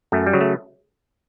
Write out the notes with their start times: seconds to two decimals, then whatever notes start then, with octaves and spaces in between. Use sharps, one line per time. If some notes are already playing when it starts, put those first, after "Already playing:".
0.12 F#2 A3
0.26 G3
0.33 C#3 F#3
0.41 A3